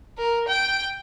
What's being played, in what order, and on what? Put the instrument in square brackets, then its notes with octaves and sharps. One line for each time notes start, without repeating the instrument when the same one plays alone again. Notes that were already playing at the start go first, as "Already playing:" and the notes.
[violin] A#4
G5